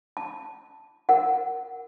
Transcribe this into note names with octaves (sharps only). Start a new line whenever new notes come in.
A5
A#4 F#5